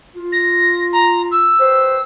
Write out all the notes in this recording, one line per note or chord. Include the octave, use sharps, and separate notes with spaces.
F4
A#6
A#5
E6
G4 B4 C5